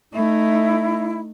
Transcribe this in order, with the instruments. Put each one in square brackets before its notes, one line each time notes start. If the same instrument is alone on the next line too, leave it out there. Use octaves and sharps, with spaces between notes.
[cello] A3 D#4 [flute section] E4